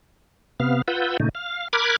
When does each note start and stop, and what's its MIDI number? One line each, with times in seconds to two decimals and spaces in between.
0.60 0.82 48
0.60 0.82 59
0.60 0.82 77
0.88 1.17 65
0.88 1.17 71
0.88 1.17 78
0.88 1.17 88
0.88 1.17 91
1.20 1.29 46
1.20 1.29 49
1.20 1.29 57
1.20 1.29 63
1.35 1.68 77
1.73 1.96 70
1.73 1.96 83
1.73 1.96 86
1.73 1.96 89
1.73 1.96 90
1.73 1.96 92